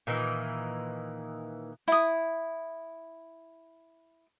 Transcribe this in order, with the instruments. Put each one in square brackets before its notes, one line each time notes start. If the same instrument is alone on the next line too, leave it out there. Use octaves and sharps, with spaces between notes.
[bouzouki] A#2 D#3 E3
[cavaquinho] E4 D#6